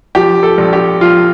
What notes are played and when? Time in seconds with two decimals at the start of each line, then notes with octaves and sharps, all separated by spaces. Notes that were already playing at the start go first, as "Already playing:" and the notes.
0.15 F3 G4
0.43 A4
0.58 A#1
0.73 G4
1.01 F3 F4